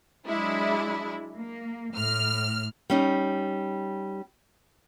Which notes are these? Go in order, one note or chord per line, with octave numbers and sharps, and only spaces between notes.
F#3 G#3 D4 E4
A#3
A2 F6
G3 C#4 D#4